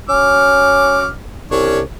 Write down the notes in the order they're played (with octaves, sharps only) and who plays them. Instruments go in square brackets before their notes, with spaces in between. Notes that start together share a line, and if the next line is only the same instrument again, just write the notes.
[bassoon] C#4 [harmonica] F#4 D6 F6
[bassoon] C2 [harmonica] C#4 D4 C#5